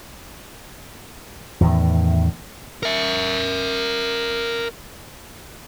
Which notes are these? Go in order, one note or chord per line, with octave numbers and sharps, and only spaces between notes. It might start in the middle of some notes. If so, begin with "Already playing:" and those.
E2 A2 D#3
A#4 E5